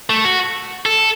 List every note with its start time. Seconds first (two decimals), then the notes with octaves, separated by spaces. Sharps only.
0.10 A3
0.24 F#4
0.86 A4